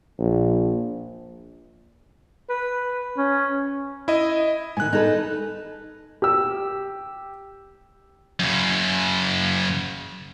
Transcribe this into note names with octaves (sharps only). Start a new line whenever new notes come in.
A#1
B4
C#4
E4 D#5
A2 D#3 G#5 F#6
D#4 A4 B4
G4 E6
F#2 C#3